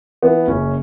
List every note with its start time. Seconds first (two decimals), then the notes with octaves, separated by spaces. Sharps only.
0.23 E3 B3
0.48 F#1 C#4